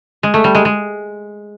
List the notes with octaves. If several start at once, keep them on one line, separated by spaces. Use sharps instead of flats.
G#3
A3
G3
G#3
G#3